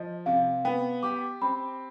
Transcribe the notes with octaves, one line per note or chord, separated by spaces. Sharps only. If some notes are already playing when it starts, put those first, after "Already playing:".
Already playing: F3 D#5
C3 F5
B3 G5
G4 D6
C4 B5